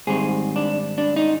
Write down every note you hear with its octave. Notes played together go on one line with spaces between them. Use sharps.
G#2 D#3 G3 C4 G#4
D4
D4
D#4